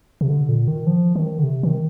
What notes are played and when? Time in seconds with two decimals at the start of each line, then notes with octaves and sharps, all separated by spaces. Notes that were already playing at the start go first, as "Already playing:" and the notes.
0.21 C3
0.29 D3
0.49 A#2
0.68 D#3
0.87 F3
1.16 D#3
1.38 D3
1.44 C3
1.63 D#3